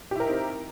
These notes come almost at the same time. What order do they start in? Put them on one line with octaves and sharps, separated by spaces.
G4 E4 A#4 D#4 C4